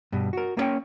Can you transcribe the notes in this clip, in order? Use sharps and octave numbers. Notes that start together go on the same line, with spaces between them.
G2 B2
F#4 A#4
A#3 B3 C#4 C#5 G5